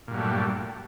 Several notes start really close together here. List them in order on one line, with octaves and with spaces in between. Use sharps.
A#2 G2 F#3 A3 G3